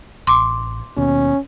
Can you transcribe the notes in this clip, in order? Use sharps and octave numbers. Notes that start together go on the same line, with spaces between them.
A1 C6 D6
D#2 B2 C#4